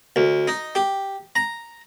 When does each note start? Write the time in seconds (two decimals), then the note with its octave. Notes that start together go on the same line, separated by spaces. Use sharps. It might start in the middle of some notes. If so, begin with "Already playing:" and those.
0.16 D2
0.48 D#4
0.75 G4
1.36 A#5